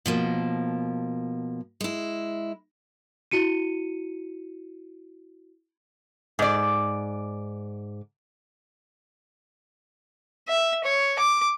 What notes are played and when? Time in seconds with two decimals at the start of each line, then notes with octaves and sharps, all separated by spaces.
0.06 B2 F3 A#3
1.81 G#3 E4
3.31 E4 F#4 C#7 D#7
6.39 G#2 D5
10.48 E5
10.84 C#5
11.19 D6